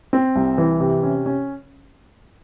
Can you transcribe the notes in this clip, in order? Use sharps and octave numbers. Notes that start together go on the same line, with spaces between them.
C4
C2
E3
C3
C#4
C#4